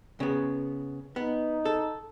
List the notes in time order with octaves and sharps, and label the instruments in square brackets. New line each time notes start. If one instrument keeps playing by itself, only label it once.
[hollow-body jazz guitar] C#3 B3
[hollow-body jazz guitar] B3 [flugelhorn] D#4
[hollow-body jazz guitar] A4